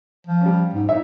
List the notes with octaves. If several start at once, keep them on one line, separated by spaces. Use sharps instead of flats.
F3
G3 C#4
G#2
A2 D#4 E5